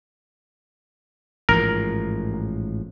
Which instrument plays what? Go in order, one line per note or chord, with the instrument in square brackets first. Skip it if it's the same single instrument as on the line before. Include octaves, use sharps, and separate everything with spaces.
[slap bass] A1 G#2 F3 [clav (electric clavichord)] A#4